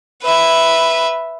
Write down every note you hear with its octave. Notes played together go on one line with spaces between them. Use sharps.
B4 E5